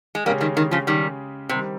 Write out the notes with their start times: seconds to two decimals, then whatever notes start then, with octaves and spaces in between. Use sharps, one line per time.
0.15 G#3
0.25 C#3 G3 G#3 A#3 C#4 G4
0.40 D#3 G3
0.57 D#3
0.71 C#3 F3
0.87 D#3 G3
1.49 C3 D#3 G3 C4